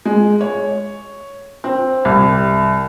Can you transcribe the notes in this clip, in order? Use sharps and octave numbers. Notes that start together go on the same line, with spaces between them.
G#3
C#5
C4
C2